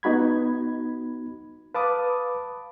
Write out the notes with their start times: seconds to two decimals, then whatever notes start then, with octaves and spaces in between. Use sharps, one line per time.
0.03 B3 D#4 F#4 B5 G#6
1.75 B4 F5 A5 B5 D6 D#6